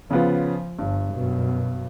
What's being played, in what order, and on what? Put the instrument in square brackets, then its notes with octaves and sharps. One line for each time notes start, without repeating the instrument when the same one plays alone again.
[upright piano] C#3 B3 F4 [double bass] F3
[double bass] G1 [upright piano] G2
[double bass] F#2 B2